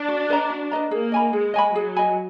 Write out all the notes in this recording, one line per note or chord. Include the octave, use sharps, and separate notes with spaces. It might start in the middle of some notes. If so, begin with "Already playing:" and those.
Already playing: D4
F#4
B4 D#5 A#5
F#4
B4 D#5 A#5
A#3 G#4
D#5 G#5 B5
G#3 G#4
D#5 G#5 B5
F#3 G#4
D#5 G#5 B5